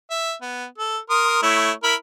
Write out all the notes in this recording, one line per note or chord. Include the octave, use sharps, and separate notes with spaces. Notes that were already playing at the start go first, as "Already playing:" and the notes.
E5
B3
A4
A#4 C6 D#6
A3 E4 C#5
E4 A#4 B5